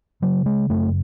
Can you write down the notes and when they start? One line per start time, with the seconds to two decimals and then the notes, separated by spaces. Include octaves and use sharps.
0.22 C#3 F#3
0.46 G#3
0.70 F#2 A3